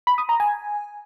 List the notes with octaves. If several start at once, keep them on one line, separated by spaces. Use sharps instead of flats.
B5
D#6
A#5
G#5